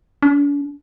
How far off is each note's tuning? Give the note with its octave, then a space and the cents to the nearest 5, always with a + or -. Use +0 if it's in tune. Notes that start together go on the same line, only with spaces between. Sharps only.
D4 -45